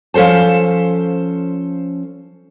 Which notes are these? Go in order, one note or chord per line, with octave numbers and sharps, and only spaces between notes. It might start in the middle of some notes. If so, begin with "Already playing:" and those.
F3 C#4 A4 C5 A5